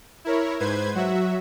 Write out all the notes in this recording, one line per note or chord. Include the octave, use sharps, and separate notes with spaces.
E4 A#4 C#5
G#2 B4 C5 G#6
F#3 F#4 E5